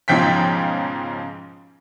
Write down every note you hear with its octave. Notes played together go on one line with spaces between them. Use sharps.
B1 G#2 C#3 F3 G5 B6